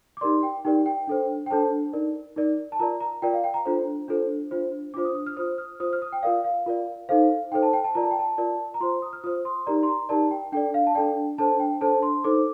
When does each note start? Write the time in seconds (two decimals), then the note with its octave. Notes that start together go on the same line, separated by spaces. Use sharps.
0.17 D6
0.21 D#4 G4 A#4 D5 C6
0.43 G5
0.64 D#4 G4 A#4 D5 G5
0.86 G5
1.07 D4 A4 C5
1.46 G5
1.50 D4 A4 C5 A5
1.93 D#4 A#4 D5
2.36 D#4 A#4 D5
2.72 A5
2.79 F4 A#4 D5 A#5
3.01 A#5
3.22 F4 A#4 D5 G5
3.33 F5
3.44 G5
3.54 A#5
3.65 D4 F4 A4 C5
4.08 D4 F4 A4 C5
4.51 D4 F4 C5
4.94 D4 F4 C5 D6
5.05 D#6
5.15 D#6
5.26 F6
5.37 F4 C5 D#6
5.58 F6
5.80 F4 C5 D#6
5.93 F6
6.02 D#6
6.12 G5
6.23 F4 A#4 D5 F5
6.44 F5
6.66 F4 A#4 D5
7.09 D#4 A4 C5 F5
7.52 D#4 A4 C5 G5
7.62 A5
7.73 G5
7.84 A5
7.95 F4 A#4 D5 A#5
8.03 A5
8.11 G5
8.19 A5
8.38 F4 A#4 D5
8.74 A#5
8.80 F4 C5 C6
9.02 D#6
9.13 F6
9.24 F4 C5 D#6
9.45 C6
9.67 D#4 G4 A#4 D5 A#5
9.83 C6
9.88 A#5
10.09 D#4 G4 A#4 D5 A5
10.31 G5
10.52 D4 A4 D5 G5
10.74 F5
10.87 A5
10.95 D4 A4 D5 G5
11.38 D4 A4 C5 A5
11.60 G5
11.81 D4 A4 C5 A5
12.03 C6
12.24 D#4 A4 C5 D6